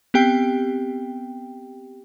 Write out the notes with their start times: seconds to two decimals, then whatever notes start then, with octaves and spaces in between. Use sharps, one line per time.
0.14 B3 C4 G4 G5